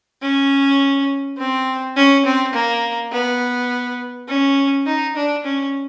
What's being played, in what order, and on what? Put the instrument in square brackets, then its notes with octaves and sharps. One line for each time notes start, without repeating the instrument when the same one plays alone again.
[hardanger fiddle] C#4
C4
C#4
C4
A#3
B3
C#4
D#4
D4
C#4